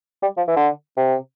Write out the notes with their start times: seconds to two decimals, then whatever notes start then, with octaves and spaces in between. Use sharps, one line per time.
0.22 G3
0.37 F3
0.48 E3
0.56 D3
0.97 C3